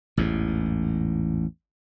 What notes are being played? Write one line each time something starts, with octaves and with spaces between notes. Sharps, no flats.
A1 E2 G#2